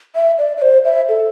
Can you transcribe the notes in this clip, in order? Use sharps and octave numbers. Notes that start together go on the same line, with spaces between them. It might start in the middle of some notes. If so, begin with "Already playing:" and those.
E5
D5
D5
C5
E5
A4